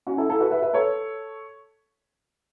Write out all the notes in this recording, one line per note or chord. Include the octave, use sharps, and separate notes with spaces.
C#4 F#4
E4 A4
E4 A4
F#4 B4
B4 E5
B4 E5
A4 C#5